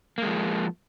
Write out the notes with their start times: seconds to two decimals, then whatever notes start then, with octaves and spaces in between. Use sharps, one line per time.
0.18 A#3
0.22 G#3
0.26 F3